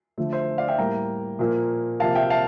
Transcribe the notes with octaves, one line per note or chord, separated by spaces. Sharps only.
D3 F3 A3
C5 E5
D5 F5
E5 G5
A2 G3 A#3 G5 A#5
A#2 F3 A#3
C3 F3 A#3 F5 A5
E5 G5
F5 A5